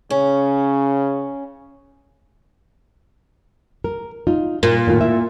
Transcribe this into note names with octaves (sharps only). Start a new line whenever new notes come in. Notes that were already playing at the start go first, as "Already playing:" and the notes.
C#3 C#4
A#4
D#4 F4
A#2 A#4
A2 D#3 F4
E4 E5